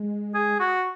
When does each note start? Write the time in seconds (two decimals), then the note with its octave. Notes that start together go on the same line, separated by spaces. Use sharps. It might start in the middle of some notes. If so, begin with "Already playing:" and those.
Already playing: G#3
0.34 G#4
0.60 F#4